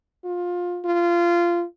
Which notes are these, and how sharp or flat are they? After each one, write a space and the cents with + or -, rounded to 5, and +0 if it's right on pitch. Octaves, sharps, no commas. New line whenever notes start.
F4 +20
F4 -20